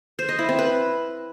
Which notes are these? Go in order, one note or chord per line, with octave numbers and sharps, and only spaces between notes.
C5
D#5
E4
C4
B4